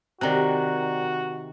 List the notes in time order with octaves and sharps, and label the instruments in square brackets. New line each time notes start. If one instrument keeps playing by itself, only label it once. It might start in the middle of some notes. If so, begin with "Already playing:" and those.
[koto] C3 D#3 [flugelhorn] F#4 [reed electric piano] D5 A#5 F#6